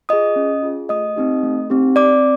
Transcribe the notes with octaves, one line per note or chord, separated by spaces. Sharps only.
F4 G#4 D#5 D#6
C#4
F4 G#4
A3 D#5 D#6
C4 D#4 G4
A3
C4 D#4 G4
C4 D5 D6